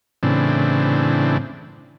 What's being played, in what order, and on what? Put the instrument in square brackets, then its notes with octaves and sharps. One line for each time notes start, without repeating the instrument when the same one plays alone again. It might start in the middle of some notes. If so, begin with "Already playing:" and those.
[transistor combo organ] A2 C#3 E3 C4 D4